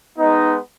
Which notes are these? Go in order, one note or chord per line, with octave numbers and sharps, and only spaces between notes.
G#3 B3 D#4